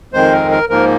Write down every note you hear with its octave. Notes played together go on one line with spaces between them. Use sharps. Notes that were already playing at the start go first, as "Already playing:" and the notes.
F2 D#3 G#3 C4 C5
A#4
A#4
G#2 F3 A#3 A#4